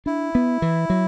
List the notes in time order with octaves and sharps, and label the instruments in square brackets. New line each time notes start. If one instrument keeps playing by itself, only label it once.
[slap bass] D4 [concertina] E4
[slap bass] B3
E3
F#3